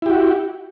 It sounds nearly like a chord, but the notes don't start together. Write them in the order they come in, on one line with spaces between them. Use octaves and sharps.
E4 G4 F#4